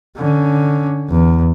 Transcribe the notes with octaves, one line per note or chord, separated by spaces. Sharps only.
D3 C#4
E2